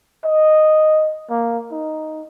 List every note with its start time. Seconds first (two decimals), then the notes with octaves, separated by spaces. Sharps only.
0.25 D#5
1.30 A#3
1.72 D#4